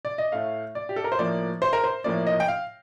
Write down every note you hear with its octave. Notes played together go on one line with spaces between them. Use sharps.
D5
D#5
A2 A3 F5
D5
G4
A4
A#4
C5
A2 F3 A#3 D5
C5
A#4
C5
A2 F3 A#3 D5
D#5
G5
F5